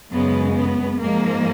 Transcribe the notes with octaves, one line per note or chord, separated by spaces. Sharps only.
F#2 C#3 G#3 B3
B3
G#2 F3 G#3 A#3